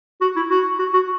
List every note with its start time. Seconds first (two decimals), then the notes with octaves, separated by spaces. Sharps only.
0.21 F#4
0.36 E4
0.50 F#4
0.79 F#4
0.94 F#4